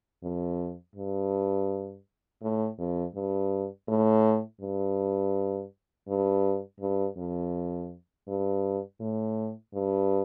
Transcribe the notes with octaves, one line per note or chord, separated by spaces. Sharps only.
F2
G2
A2
F2
G2
A2
G2
G2
G2
F2
G2
A2
G2